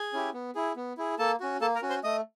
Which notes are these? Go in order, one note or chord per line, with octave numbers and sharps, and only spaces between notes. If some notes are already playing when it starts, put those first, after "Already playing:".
Already playing: G#4 G#5
C#4 E4 G4
B3
E4 G#4
B3
E4 G#4
A#3 A4 A5
C#4 F#4
A#3 A4 A5
A#4 A#5
C#4 F#4
C5 C6
A3 D#5 D#6